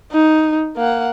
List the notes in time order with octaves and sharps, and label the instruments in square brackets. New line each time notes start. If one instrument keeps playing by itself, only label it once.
[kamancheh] D#4
A#3 F#5